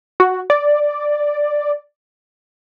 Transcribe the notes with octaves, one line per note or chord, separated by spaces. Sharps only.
F#4
D5